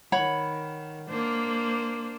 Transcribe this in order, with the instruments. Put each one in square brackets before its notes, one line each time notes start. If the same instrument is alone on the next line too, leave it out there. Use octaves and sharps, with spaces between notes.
[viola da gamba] D#3 [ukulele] C#5 F#5 B5
[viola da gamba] A#3 D4 C5